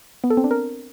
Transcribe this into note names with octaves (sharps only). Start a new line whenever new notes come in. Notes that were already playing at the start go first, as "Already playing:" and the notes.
B3
A4
C4
D4
A#4